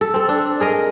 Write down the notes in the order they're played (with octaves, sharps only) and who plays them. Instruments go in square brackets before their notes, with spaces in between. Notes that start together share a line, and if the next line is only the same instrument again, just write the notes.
[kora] A4
C4 A4
D4
G#4 A#4 D#5